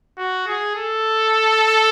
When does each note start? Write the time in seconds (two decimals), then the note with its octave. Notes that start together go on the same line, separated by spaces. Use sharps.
0.18 F#4
0.47 G#4
0.75 A4